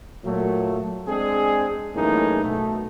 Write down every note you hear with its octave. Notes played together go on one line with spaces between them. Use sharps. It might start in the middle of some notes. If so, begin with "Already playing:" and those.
A#2 F#3 A3
G#3 C4 D4 G#4
F#2 A2 E3 A#3 D#4 G#4
B1 B2 A3